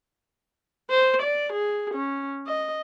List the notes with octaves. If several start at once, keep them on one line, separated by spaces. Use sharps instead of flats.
C5
D5
G#4
C#4
D#5